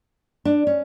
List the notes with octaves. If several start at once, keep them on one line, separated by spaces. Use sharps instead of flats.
D4
C#4